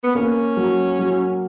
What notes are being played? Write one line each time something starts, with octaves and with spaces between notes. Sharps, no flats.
B3
A#3 C#4
F#3
F#3